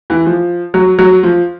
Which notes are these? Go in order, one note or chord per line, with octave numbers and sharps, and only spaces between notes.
E3
F3
F#3
F#3
F3